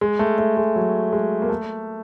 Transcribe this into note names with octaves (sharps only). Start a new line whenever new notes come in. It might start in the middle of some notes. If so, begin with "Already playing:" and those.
G#3
A3
A3
G#3
F#3
G#3
A#3
A3